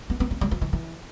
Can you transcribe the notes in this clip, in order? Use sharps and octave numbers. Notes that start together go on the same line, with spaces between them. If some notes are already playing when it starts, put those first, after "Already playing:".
B3
B3
A#3
G3
F3
E3
E3